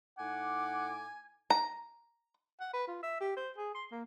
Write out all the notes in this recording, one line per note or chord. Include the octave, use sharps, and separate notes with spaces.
A2 D#4 F#5 G#5 D6
A#5
F#5
B4
F4
E5
G4
C5
G#4
C6
A#3